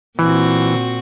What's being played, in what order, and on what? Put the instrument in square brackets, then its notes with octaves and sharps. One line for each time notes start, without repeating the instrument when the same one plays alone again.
[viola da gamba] A#2 C4 F#4 [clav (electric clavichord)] E3